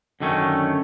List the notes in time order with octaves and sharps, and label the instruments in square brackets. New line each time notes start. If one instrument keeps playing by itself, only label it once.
[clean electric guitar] F#2 D3 D#3 A3 C4 C#4